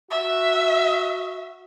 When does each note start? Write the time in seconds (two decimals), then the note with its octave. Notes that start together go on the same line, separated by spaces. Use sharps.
0.10 F#4 E5